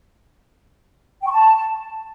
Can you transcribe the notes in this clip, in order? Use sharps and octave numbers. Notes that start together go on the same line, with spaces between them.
G5
C#6
A5